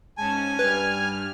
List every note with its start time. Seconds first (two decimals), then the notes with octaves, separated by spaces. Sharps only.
0.17 G#2 C#4 G#5 A5
0.59 G2 G3 B4 F6 G#6